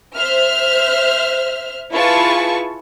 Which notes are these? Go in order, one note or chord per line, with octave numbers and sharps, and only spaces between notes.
C5 E5 F6
E4 F4 G#4 B4 A5 C#6